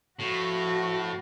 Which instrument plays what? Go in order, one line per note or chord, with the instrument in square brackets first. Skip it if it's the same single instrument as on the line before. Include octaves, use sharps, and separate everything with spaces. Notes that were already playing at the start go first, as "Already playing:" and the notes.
[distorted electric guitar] A2 [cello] F3 F#4